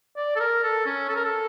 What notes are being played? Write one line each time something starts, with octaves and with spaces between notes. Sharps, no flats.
D5
A4
A#4
A4
C#4
A4
A#4
A4